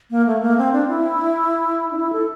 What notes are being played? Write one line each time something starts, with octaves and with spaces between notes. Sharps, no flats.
A#3
A3
A#3
C4
D4
E4
D4
E4
A4